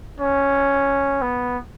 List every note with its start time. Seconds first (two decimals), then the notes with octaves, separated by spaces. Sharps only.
0.20 C#4
1.22 B3